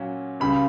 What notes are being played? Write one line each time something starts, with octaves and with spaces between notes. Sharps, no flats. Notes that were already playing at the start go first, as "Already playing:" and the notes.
Already playing: A#2 F#3 C#4
C#2 C#3 G3 B5